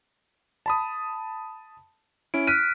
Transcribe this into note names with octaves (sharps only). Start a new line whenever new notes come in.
A5 B5 D#6
C#4 E4 D7
F6 F#6 B6 D#7